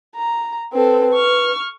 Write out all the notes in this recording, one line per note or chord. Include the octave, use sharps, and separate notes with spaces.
A#5
C4 A4 B4
C#6 F6